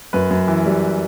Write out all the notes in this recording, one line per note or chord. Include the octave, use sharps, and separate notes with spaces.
F#2 B4
F#2
E3
G3